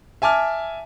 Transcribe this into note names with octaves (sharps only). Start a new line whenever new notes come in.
E5 G#5 A5 D6 F6